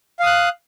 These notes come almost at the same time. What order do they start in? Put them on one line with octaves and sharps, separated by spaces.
F5 D#6 F#6